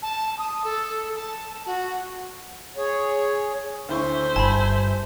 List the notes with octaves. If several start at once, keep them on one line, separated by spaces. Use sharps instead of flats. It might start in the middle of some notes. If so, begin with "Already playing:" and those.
A5
D#6
A4
A5
F#4
G#4 C#5
D2 E4 C5 E5 C#6
G1 G#5 A5 B5